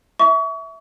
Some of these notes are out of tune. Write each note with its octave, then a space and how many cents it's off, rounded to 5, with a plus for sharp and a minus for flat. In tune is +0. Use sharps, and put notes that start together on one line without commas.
E5 -10 C#6 +35